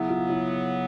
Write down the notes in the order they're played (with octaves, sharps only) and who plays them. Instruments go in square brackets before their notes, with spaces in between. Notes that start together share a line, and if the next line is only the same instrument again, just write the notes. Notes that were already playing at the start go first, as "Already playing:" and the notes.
Already playing: [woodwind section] C#3 F#3 B3 [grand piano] E4
[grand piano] F4
E4